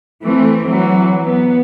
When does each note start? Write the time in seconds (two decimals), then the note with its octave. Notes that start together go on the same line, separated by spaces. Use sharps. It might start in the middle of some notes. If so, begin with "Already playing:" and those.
0.24 E3 A3 C4
0.68 E3 F#3
1.29 B3